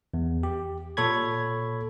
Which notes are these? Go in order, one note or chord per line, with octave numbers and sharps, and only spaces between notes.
E2
G4
A#2 A4 C#5 B5 G#6